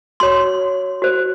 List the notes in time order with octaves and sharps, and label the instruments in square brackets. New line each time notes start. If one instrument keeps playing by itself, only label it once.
[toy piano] F#4 C#5 C6
F#4 C5